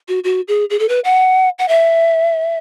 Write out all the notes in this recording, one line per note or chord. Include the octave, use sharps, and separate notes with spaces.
F#4
F#4
G#4
G#4
A4
B4
F#5
F#5
E5